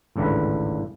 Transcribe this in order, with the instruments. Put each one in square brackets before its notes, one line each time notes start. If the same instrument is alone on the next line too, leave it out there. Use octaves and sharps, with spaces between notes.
[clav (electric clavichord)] G#1 C#2 A2 D3 B4